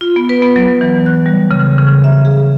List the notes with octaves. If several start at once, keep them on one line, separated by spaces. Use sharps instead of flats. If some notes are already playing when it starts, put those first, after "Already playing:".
F4
B3
B4
B3
F#3
E3
F#6
G3
C#3
C#3
E5
G#4